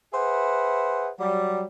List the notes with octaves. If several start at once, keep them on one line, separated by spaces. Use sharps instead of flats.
G#4 B4 C5 E5 F#5
F#3 G3